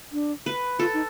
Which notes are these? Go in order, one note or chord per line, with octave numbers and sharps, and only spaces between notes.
D4
B4
F4 A4
D#4